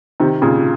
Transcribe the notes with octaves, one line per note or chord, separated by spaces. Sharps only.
C3 D#3
A#2 C#3